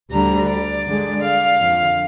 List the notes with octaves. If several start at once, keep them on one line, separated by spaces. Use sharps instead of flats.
D2 D3 G3 A#5
D5
G2 D3 G#3
F5
F2 D3 F3